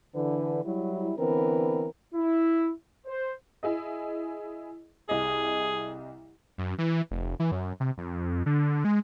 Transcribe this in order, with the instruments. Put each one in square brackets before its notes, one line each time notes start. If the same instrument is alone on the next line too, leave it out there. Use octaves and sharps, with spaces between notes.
[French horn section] D3 E3 B4
F#3 G3 E4
D3 E3 B3 C4 A#4 B4
[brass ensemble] E4
C5
[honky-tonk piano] E4 G#4 D#5
[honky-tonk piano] C2 D#5 [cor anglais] G#4
[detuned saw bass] F#2
E3
F1
E3
F#2
C3
F2
D3
G#3